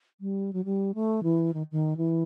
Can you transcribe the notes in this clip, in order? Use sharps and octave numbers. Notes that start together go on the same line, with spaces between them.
G3
F#3
G3
A3
E3
D#3
D#3
E3